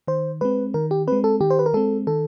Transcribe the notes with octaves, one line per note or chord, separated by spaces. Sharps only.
D#3 C5
G#3 C4 B4
D#3 A#4
G4
G#3 C4 B4
A4
D#3 G4
C5
B4
A#4
G#3 C4 A4
D#3 A4